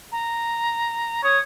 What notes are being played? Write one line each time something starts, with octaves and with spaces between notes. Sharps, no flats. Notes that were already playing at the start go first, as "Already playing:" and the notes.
A#5
C#5 D#6